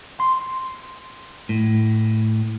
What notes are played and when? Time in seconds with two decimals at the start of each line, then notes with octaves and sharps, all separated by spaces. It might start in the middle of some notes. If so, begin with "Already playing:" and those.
0.20 C6
1.49 A2